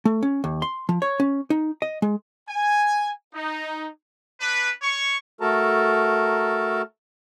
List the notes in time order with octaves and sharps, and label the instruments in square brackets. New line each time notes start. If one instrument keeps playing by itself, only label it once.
[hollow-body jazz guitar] A3
C#4
D#2
C6
F3
C#5
C#4
D#4
D#5
G#3
[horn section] G#5
D#4
[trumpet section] D4 B4
C#5 C#6
[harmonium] A3 F#4 A4 A#4 A5 A#5